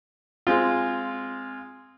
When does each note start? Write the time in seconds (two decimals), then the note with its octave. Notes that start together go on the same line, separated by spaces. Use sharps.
0.47 G#3 C4 F4